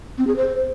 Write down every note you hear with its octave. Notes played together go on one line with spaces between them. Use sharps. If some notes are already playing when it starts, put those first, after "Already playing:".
C4
G#4
C5